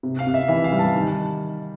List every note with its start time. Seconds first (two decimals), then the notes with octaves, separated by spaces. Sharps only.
0.03 C3
0.19 F5
0.27 C3
0.34 E5
0.48 E3 E5
0.64 F5
0.72 G3
0.79 A5
0.94 D#3